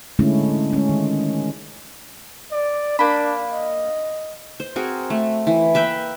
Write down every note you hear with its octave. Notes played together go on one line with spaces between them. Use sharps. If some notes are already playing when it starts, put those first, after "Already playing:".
D3 G#3 A3 C#4 E4
G#3 C#4
D#3
D5
A#3 D4 B5
D#5
C5
C4 F#4 G#4 A#4
A3
E3
A#3 B4 E5 G5